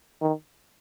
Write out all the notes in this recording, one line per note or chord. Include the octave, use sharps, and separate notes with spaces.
D#3